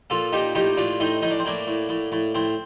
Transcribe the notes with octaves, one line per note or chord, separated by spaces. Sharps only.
A#2 F4 A4
A#2 D#4 G4
A2 D#4 G4
A2 D4 F4
A2 C4 D#4
A2 D#4
D4
C4
A2 A#3 D4
A2
A2
A2
A2 C4